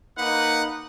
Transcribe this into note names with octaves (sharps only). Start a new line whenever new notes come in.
A#3 D#4 B4 F#5